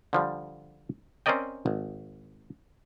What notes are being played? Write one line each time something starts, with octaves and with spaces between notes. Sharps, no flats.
D3 F3 G3
C4 C#4 A#4 D5 D#5 G5
G#1